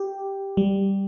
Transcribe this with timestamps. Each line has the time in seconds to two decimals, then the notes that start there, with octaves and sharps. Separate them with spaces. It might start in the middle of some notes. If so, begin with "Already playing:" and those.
Already playing: G4
0.57 G3